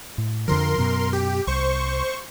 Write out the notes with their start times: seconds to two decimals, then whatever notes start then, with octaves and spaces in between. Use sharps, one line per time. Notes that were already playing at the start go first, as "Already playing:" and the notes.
0.18 A2
0.48 F2 D3 F3 A#4 C6
0.78 F#2 B2
1.13 G4
1.47 C2 C5 C#6